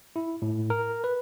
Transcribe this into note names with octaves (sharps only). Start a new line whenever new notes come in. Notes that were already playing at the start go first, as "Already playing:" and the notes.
E4
A2
A#4
B4